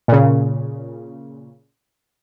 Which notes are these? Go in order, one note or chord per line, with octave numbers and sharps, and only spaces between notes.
A#2 C#3